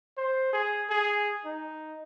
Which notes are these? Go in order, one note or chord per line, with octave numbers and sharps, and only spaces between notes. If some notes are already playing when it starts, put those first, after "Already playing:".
C5
G#4
G#4
D#4